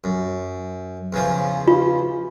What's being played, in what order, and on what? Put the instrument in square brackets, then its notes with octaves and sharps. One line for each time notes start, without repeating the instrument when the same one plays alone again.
[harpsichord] F#2
E2 C#3 F3
[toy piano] F4